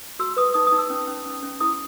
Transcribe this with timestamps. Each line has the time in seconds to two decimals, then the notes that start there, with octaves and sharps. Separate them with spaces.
0.19 F#4 E6
0.36 B4 D#6
0.54 D#4 D#6
0.67 D#6
0.72 D#4
0.78 E6
0.90 C#4
1.07 C#4
1.26 C#4
1.43 C#4
1.60 E4 D#6